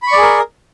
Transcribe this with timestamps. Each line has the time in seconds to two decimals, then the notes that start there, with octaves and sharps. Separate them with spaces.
0.03 B5
0.07 C#6
0.12 D5
0.17 G#4
0.22 A#4